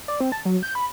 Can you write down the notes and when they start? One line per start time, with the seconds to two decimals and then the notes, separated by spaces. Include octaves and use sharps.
0.08 D5
0.21 C4
0.32 A5
0.45 F#3
0.63 G6
0.75 B5